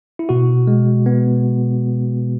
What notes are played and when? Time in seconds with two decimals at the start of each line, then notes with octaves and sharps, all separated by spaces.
0.19 E4
0.29 B2 F#4
0.67 G#3
1.06 B3